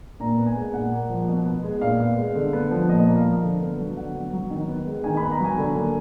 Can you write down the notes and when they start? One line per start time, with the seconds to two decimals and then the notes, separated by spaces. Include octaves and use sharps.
0.20 A#2 A#5
0.38 B3
0.46 G#5
0.56 G#3
0.73 A#2 F#5
0.91 A#3
1.09 F3
1.28 B2
1.46 B3
1.63 G#3
1.81 A#2 F5
1.99 B3
2.18 G#3
2.35 D3
2.53 B3
2.71 F3
2.89 A#2 D#5
3.06 A#3
3.16 F5
3.24 F3
3.43 D3
3.60 B3
3.78 F#3
3.97 D3 F#5
4.15 B3
4.33 F#3
4.50 D#3
4.68 B3
4.87 G#3
5.04 D#3 G#5
5.17 B3 B5
5.31 A#5
5.40 F#3 G#5
5.58 D3
5.76 A#3